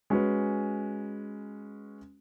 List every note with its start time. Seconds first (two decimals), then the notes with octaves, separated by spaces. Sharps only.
0.10 G#3 C#4 F#4 B4